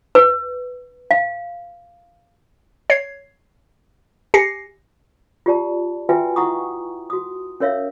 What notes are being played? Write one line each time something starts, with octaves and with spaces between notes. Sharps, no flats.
B4
F5
C#5 G#6 C7
G4 G#5 A#6 C7 C#7
F4 G4 D5 A5
F4 F#4 B4 E5 G5 G#5
E4 F#5 A#5 C#6 D#6
F#4 D#6
C#4 A#4 C#5 E5 F5